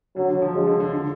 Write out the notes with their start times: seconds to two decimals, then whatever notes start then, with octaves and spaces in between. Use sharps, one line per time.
0.16 D3 F#3
0.29 D3
0.42 F3
0.54 F3 G#3
0.67 D3
0.80 D3
0.92 D3